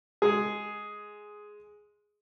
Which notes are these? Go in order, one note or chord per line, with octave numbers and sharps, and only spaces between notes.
G#3 G#4